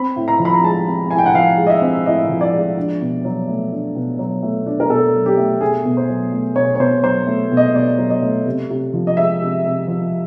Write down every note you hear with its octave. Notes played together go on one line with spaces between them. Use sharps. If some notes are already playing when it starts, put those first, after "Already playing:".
Already playing: C4 B5
A2
A#5
F3
B5
A#5
G#3 A5
C4
A2 G#5
G5
F#5
F3 F5
G#3
D#5
E5
C4
A2 D#5
F3
D5
G#3
D4
B2
F#3
A3
D4
B2
F#3
A3
D4
A#4
B2 A4
F#3
G4
A3
B2 G#4
B2
C5
F#3
A3
B2 C#5
C#5
B2 C5
F#3 C5
A3
B2
D#5
B2 D5
F#3
D#5
A3
C3
C3
F3
D#5
G#3 E5
C3
C3
F3